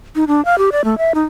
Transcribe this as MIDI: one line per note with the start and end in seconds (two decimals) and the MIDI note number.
0.16 0.25 63
0.27 0.44 62
0.45 0.58 77
0.58 0.70 67
0.72 0.84 74
0.84 0.98 57
0.98 1.12 76
1.15 1.23 63